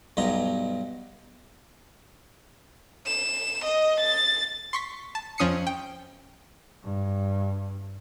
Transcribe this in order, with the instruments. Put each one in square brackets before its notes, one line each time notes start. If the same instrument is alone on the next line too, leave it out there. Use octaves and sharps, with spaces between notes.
[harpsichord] B1 G2 B2 D#4 A#5
[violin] E7
D#5
A6
[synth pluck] C6 C#6 B6
A5
F2 F3 C#4 D#6 C7 C#7
G5
[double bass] G2